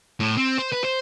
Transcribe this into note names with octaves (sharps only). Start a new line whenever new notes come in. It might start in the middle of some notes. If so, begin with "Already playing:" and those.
A2
C4
C5
B4
C5